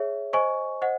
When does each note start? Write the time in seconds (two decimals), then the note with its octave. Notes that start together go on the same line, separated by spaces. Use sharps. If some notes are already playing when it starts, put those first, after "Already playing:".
Already playing: G#4 C#5 E5
0.33 C5 D#5 G#5 C#6
0.82 C5 D#5 F#5